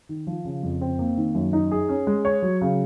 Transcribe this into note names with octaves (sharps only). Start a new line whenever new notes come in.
D#3
F3
C#3
F2
C4
A#3
D#3
F#2
D#4
G#4
C#4
G#3
C#5
F#3
C#3